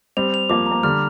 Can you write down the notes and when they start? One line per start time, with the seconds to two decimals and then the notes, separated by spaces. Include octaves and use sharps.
0.17 G3 C4 F7
0.34 F7
0.49 F3 A#3 D6
0.66 A#5
0.71 A#3
0.83 D3 G3 F6